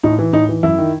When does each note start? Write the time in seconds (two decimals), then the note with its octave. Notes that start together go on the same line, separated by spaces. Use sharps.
0.04 A2 D#4
0.19 E3
0.33 A2 D#4
0.49 E3
0.63 F#2 E4
0.78 D#3